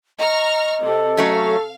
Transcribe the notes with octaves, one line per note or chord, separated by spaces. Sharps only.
D#5 A#5 C#6 F6
C3 A4
F#3 A3 C#4 F5